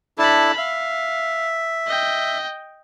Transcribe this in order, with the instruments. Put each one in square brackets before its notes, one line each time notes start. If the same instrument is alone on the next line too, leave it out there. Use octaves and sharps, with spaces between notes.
[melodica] D4 E4 A4 [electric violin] A5 B5
[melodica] E5 [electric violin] F5
[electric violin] D#5 G5